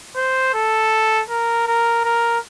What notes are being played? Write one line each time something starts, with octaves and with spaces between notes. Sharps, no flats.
C5
A4
A#4
A#4
A#4